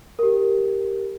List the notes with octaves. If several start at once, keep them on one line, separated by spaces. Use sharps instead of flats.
G4 A#4